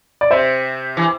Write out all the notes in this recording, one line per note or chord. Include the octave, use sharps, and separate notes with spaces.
D5
C3 C5 E5
E3